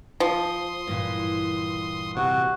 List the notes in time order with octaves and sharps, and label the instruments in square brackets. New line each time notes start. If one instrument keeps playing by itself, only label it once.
[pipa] F3 [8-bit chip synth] C6 D#6
[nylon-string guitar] G2 A#2 E3
[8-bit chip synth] C3 [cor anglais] F#4